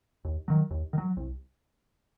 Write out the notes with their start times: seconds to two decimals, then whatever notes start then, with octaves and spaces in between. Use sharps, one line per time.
0.25 D#2
0.48 D#3 F#3
0.71 D#2
0.93 D#3
0.98 F#3
1.17 C2